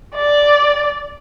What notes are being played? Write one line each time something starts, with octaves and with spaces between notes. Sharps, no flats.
D5